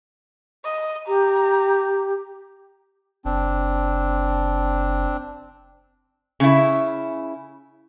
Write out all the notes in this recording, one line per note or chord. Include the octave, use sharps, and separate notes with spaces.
D#5
G4 A#5
F#1 C4 D4
C#3 E4